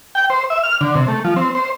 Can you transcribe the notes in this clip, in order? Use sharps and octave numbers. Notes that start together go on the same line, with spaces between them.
G5
C5
E5
F6
D3
C3
A3
F3
C4
C5